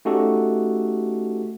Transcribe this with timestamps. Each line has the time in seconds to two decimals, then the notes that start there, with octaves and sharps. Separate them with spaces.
0.05 A3 C#4 D#4 F#4 G4 A4